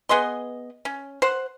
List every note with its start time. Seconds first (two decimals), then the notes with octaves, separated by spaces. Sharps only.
0.09 B3 G#4 D#5 C6
0.85 C#4
1.22 C5 F#5